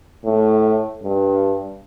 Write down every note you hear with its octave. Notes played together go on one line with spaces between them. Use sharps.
A2
G2